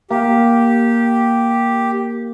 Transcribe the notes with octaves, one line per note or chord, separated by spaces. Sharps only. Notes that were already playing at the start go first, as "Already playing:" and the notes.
A#3 G4